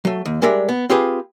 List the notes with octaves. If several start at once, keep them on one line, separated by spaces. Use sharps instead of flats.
F#3 A3
D#2
G3 G#3 D4 A#4 D5 E5
B3
C4 F4 G4 G#4 B4